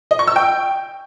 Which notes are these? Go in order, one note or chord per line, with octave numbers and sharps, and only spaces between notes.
D#5
C#6
E6
G5